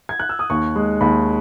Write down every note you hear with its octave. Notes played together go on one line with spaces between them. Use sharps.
G#6
F#6
E6
D#6
D#2 C#6
G#3
D#2 B5